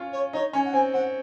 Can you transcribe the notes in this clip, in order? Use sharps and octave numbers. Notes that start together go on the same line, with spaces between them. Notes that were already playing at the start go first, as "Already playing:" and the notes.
Already playing: C#4 F4
C#5
D#4 C#5
C#4 G#5
F#5
C4 G#5
C4 F#5